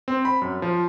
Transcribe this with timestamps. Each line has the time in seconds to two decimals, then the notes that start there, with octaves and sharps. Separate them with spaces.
0.08 C4
0.25 B5
0.42 F#2
0.62 F3